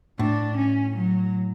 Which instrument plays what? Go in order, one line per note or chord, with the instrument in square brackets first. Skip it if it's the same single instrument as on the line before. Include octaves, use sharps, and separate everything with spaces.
[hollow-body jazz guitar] A2 [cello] D4
[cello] C#4
F#3